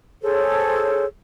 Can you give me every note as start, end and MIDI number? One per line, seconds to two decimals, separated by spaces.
0.23 1.04 68
0.23 1.04 69
0.23 1.04 72
0.23 1.04 73